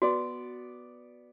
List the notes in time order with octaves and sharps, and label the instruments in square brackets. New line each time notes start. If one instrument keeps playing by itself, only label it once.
[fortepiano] B3 D5 [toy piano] F#4